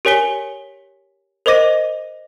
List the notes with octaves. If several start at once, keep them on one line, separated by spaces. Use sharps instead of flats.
G4 A#4 C#5 G#5 B6 G7
A#4 C5 D#5 D6 A#6 D#7